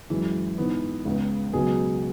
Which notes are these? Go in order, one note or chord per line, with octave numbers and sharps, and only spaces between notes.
F#2 E3 G#3
G#2 E3 B3
C#2 C#3 G#3 B3
C#2 B2 F#3 B3 G#4